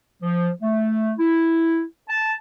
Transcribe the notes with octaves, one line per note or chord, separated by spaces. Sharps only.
F3
A3
E4
A5